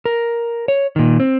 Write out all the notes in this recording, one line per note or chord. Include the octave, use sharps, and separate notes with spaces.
A#4
C#5
A#2 D#3
C4